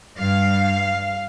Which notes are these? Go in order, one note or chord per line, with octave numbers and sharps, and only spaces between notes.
G2 G3 F5